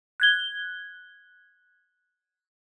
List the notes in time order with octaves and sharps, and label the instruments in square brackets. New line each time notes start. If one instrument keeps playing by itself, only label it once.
[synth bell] F#6 G#6 G7